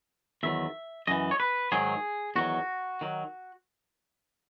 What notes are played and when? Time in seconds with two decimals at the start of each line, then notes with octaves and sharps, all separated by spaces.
0.43 E2 D#3 F#3 E5
1.07 F#2 E3 D#5
1.31 C#5
1.40 B4
1.72 G#2 D#3 F#3 G#4
2.36 E2 D#3 F#3 F#4
3.01 D#3 F#3